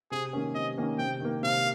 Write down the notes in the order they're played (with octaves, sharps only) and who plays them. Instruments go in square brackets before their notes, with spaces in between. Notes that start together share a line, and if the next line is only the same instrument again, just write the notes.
[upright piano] C3 [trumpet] G#4
[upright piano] D#3 A#3 C#4
[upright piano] C3 [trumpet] D#5
[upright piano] D#3 A#3 C#4
[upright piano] C3 [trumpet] G5
[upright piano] D#3 A#3
[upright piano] C3 [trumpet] F5